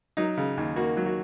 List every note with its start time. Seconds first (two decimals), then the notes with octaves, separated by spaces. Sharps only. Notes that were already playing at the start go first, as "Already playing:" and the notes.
0.17 F#3 D#4
0.37 C#3
0.57 D#2
0.76 A#3 F#4
0.97 F#3
1.06 F#4